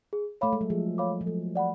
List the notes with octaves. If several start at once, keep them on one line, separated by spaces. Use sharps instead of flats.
G#4
A3 C#5 F5 B5 D6
G#3
F#3
F3 G#4
C#5 F5 B5 D6
F3
F#3 A4
D5 F#5 B5